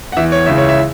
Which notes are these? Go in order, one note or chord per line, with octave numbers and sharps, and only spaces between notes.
F#5
E2 E3 E5
C#5
C#2 C#3 E3 E5
C#5
E5